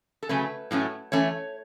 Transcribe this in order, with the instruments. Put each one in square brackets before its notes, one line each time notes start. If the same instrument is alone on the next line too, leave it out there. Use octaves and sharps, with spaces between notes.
[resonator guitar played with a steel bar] A4
C#3 F#3 A3 C#4 B4
A2 F#3 A3 C#4
E3 A3 C#4 C#5